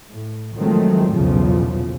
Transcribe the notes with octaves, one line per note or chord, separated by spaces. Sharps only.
A2
D#3 F3 F#3 G#3 A3 C4
B1 E2 A#2 C#3 F3